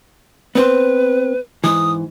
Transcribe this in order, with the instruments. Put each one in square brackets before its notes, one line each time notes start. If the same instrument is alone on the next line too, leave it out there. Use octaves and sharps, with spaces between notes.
[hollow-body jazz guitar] B3 C4 C5 [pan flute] B4
[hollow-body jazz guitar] G#2 E3 [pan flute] D#6